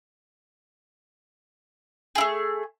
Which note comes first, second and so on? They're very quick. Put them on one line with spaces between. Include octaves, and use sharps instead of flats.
G#4 E4 A3